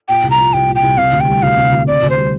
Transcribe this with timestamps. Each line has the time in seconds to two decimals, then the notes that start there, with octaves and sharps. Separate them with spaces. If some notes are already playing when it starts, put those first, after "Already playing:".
0.08 A#2 G5
0.23 C2
0.30 A#5
0.38 F3
0.53 C2 G5
0.68 A#2
0.75 G5
0.83 C2
0.97 C3 F5
1.13 D2
1.20 G5
1.28 G3
1.43 D2 F5
1.57 C3
1.73 D2
1.87 C3 D5
2.02 D2
2.10 C5
2.18 G3